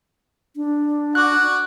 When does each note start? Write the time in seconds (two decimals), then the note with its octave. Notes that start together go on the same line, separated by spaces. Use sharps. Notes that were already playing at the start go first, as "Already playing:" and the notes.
0.56 D4
1.15 F#4 D5 F#6